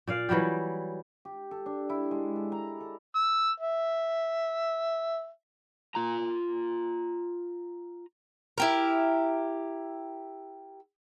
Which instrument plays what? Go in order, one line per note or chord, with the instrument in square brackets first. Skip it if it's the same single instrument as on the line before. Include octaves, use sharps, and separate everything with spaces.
[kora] A#2 D5 F5
E3 F#3 G3 G4
[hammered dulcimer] G4
A4
D4
E4
G#3
A4
A#5
A4
[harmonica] E6
E5
[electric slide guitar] F4 A#5
[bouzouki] E4 G4 A#4